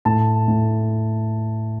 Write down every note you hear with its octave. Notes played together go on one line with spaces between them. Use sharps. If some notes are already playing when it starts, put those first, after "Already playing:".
A2 A5
A2